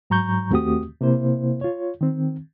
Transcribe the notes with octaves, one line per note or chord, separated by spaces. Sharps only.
G#2 F#3 A#5 C#6 G6
D#2 A3 C4 F#4 G4 D#6
C3 A#3 E4 C5
F4 C#5
D#3 C4